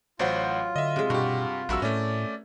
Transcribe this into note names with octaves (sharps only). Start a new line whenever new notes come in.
A1 F#3 F4 C5 F#5
D3 D#5 E5
C3 G#3
G2 B2 F#4 G4
A#1 G2 F#4 A#4 B4 E5 E6
A2 A3 C#4 D5